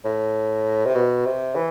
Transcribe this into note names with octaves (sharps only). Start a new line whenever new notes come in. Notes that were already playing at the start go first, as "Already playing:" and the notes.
A2
C3
B2
C3
E3